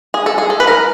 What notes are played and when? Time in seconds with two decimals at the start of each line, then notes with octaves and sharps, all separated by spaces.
0.14 G#4
0.26 A4
0.38 G#4
0.50 A4
0.60 B4
0.67 A#4